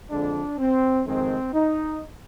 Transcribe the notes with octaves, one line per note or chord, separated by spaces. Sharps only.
F2 D3 G#3 D4
C4
F2 D#3 G#3 C4
D#4